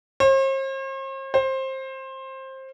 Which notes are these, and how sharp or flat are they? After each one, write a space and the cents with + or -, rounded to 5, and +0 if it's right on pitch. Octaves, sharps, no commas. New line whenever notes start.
C5 +45
C5 +20